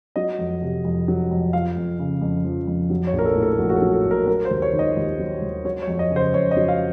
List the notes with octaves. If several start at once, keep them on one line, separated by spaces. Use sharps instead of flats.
F#3 D#5
F2
C3
F2
F#3
F2
F3 F5
F2
C#3
F2
F3
F2
F#3
C#5
A#1
A#4
A4
A2
A4
A#1 F#4
F#4
A4
F#3
A4
A#1
A#4
F#3 A#4
C5
D#2
C#5
D#3
D#5
D#2
F#3
D#2
F#3 C#5
C#5
F2
D#5
C#3
C5
F2 C#5
D#5
F#3
F5